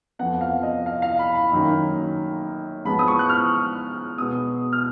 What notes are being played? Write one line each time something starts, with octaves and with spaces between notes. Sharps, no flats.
F2 F3 B3 F#5
F5
D#5
F5
F5
B5
B5
F#2 D#3 A#3
G#2 F3 G#3 B3 B5
D#6
C#6
F#6
F6
B2 G#3 B3 D#6
F6